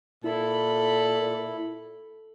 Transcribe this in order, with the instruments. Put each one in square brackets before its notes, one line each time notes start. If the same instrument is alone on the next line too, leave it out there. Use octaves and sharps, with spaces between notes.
[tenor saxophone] A#2 [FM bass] E4 [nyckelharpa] A4 B5